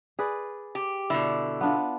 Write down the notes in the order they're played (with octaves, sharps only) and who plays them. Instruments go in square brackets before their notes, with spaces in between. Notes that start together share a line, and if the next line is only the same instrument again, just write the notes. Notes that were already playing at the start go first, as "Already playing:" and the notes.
[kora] G#4 B4 D5
[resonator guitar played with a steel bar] G4
[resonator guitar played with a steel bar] B2 D3 [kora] E4
[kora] B3 D4 F4